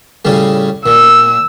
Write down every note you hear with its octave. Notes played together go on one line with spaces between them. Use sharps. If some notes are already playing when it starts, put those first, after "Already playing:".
A2 C#3 G3
A#2 E6